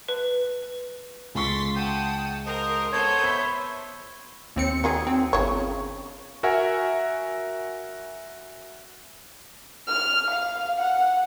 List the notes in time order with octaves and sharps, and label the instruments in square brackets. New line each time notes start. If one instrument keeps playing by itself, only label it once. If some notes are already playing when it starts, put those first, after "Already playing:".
[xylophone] B4
[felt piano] C#2 C#6 [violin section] C6 A6 B6
[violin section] F#5 A5 D#6 [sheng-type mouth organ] G5
[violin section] A#4 [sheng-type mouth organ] C5 D#5
[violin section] B3 C5 G6 [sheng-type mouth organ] A4 [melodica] C#5
[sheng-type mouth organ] E5 [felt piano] B5
[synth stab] D#2 C4 C#7
[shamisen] D#3 F#3 G#4
[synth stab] C4
[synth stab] G1 [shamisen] C#3 C#5
[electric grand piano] F#4 A#4 E5 F#5 G#5
[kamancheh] F6
F5
F#5